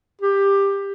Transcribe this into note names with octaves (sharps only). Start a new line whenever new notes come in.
G4